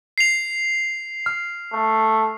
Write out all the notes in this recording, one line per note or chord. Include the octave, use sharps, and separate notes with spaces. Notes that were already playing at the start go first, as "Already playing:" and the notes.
C7 F7
F6
A3